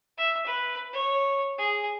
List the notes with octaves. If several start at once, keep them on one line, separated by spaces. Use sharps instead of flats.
E5
B4
C#5
G#4